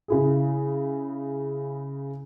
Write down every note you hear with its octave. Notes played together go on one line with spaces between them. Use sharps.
C#3 E4 G#4